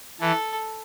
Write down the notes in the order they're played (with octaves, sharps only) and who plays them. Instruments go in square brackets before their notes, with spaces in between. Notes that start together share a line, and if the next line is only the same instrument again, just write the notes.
[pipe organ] E3 [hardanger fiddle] A4